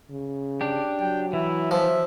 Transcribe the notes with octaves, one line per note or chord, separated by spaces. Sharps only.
C#3
D4 G4
F#3 G5
E3 E4
F3 E5